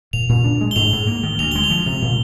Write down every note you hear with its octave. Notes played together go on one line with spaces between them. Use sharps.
A#2 F7
A#2
D4
G#3
G7
G#2 F7
G#2
A#3
D#3
D2 F7
G#3 G7
F7
F3
C3
A#2